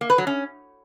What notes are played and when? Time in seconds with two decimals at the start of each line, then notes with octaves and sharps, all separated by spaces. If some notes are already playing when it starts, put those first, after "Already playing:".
0.01 A#3
0.10 B4
0.18 F#3
0.27 C#4